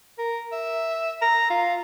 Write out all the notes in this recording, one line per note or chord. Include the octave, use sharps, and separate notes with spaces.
A#4
E5
A#5
F4